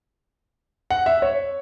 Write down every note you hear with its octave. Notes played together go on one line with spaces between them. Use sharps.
F#5
E5
C#5